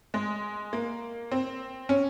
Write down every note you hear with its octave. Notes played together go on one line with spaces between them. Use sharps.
G#3
A#3
C4
C#4